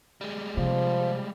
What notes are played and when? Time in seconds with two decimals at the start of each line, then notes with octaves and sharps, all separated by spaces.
0.21 G3 G#3
0.57 C3 F3